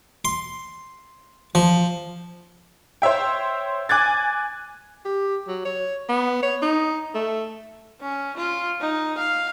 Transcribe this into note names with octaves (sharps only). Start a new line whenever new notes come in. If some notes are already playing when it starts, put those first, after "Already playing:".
C6
F3
C5 C#5 E5 G5
G#5 D6 F#6 G#6 A6
G4
F#3
C#5
B3
C#5
D#4
A3
C#4
F4
D#4
F5